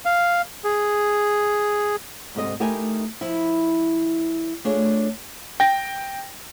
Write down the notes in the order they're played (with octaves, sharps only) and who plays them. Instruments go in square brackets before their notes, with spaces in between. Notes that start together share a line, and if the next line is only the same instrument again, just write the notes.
[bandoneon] F5
G#4
[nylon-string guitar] D2 G#2 C3 A4 D#5
A3 D#4 E4 G4 A#4 G#5
F3 E4
A3 D4 F4 G#4 C#5
[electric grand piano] G5 A#6